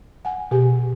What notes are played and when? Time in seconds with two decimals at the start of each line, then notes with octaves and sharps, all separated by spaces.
0.25 F#5 G#5
0.51 B2 G4 G#4 G#5